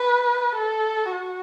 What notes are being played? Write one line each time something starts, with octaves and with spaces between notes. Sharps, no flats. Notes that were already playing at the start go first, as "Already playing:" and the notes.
Already playing: B4
A4
F#4